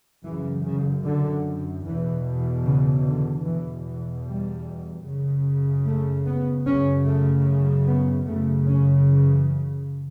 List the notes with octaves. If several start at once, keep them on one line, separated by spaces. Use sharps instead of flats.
F#2 C#3 E3
C#3
D3
E2 B2 E3
C#3
D3
E2 B2 E3
E3
G3
F#2 C#3
A3
B3
F#2 C#3 C#4
A3
B3
F#2 C#3 A3
C#4
E3